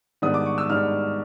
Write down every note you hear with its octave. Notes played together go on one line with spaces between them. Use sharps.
G#2 D#3 G3 B3 D4 D#6
D6
C#6
E6
G#2 D#3 G3 B3 D4 F6